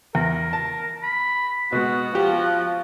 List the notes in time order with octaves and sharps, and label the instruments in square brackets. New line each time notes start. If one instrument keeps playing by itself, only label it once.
[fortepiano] E2 [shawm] A#4
[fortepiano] A5
[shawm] B5
[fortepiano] B2 G#3 [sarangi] B3 [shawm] F#4
[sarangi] F3 [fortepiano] G4